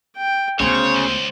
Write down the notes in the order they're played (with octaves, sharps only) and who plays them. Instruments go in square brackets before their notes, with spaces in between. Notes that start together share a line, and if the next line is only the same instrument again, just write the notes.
[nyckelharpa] G5
[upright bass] D2 B3 [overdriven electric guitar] C#3 [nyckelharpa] C5 [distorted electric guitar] C#5
[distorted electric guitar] C#2